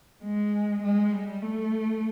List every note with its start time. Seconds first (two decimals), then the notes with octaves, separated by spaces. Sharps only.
0.23 G#3
0.83 G#3
1.12 G3
1.42 A3